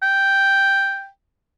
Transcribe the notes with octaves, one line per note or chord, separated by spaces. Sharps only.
G5